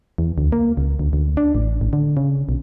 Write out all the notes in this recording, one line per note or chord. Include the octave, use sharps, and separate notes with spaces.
E2
D2
A#3
C#2
D2
D2
D4
A1
A1
D3
C#3
B1